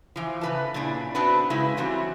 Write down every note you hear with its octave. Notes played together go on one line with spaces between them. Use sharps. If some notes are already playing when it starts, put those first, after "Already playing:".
E3 F3
C#3 B4 A5
A#2 C#3 D4 E4
B3 C4 D4 F#4 B4
C#3 G#3 E4 B4
E3 F#3 G3 C4 F#4